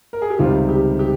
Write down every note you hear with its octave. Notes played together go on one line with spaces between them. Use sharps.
A#4
G#4
G4
C#2 C3 D#3 G3 F4
G4
G4